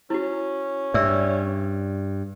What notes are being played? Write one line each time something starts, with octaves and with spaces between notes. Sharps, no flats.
C#4 E4 F#4
G2 D5 E5 E6